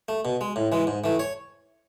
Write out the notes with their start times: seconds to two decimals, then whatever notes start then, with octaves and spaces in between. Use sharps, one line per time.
0.08 A3
0.25 B2
0.41 G#3
0.56 A2
0.72 E3 G#3
0.87 G#2
1.04 E3 A3
1.19 C#5